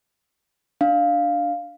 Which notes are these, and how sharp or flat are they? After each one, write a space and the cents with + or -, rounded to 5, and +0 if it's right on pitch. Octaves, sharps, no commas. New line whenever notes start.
D4 +0 F5 +0